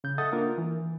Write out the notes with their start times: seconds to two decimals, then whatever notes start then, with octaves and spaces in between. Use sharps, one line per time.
0.04 C#3 G6
0.18 A4 D#5 E5 F#5 D#6 A6
0.32 A#3 D4 F4 A#4
0.58 E3